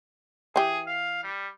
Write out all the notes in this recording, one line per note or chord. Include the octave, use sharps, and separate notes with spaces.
E3 G4 G#4
F5
G3